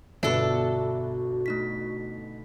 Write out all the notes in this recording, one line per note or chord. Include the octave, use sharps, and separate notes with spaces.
G1 B2 D4 F#4 A4 B4 E5
A3 D#4 B6